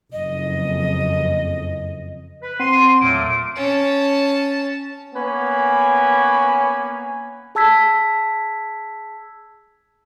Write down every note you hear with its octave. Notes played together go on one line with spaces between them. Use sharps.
F#1 F2 D#5
B4
C4 F#5 C6 D#7
E2 A#2 F#3 A3 A#3 D7
C#4 A5
A#3 B3 C#4 B4 G#5
G#4 A5 E6 G#6 B6